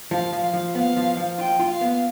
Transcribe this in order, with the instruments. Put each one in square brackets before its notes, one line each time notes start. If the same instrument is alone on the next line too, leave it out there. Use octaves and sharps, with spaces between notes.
[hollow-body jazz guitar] F3 [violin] F5
[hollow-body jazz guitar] F3
[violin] F5
[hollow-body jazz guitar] F3
[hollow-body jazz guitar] B3 [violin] F5
[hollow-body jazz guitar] F3
F3
[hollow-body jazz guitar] F4 [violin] G5
[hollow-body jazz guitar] F4
[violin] F5
[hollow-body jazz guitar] B3